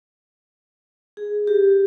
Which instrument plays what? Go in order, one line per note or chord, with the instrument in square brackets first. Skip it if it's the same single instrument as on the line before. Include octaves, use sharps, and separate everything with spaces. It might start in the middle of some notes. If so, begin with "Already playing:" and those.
[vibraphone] G#4
G4